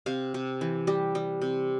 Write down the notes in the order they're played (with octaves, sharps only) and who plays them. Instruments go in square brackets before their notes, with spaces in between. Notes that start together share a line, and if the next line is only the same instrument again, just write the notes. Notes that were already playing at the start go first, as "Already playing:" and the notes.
[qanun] C3 F5
C3
E3
G3 G4
G3
C3